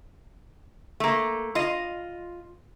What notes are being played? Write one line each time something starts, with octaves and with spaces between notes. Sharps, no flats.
A3 A#3
F4 D#5